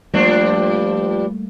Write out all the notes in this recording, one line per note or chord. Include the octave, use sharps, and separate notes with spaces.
G2 F3 G3 A3 A#3 D4